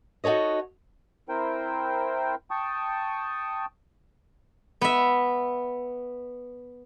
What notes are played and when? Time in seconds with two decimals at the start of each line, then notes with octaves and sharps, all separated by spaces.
0.24 D#4 F#4 A4 C#5 D#5
1.29 C4 E4 A#4 C5 G5
2.51 G5 A5 C#6 D#6
4.82 B3 E5